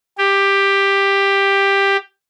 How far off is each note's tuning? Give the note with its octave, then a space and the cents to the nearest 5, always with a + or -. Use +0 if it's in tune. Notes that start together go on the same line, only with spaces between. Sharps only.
G4 +10